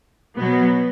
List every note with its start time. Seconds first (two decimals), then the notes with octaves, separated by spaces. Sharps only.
0.39 B2 F#3 B3